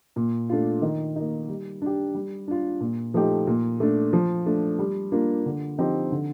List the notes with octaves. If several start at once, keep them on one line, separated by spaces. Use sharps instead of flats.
A#2
A3 D4 F4
D#3
A#3 D#4
G3
D4 G4
G3
D4 F4
A#2
F3 A3 D#4 G4
A#2
A3 D4
F3
A3 D4
G3
A#3 D4 F4
D3
F3 C4 D#4 G4
D3